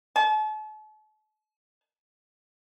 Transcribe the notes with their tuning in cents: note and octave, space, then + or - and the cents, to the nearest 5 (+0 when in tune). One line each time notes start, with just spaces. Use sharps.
A5 -40